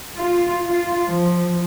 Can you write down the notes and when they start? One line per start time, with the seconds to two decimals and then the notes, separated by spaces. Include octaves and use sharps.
0.19 F4
0.68 F4
1.11 F3